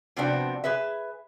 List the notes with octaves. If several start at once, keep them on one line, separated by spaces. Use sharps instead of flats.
C3 F3 B3 C4 D4 F#4
G#4 B4 E5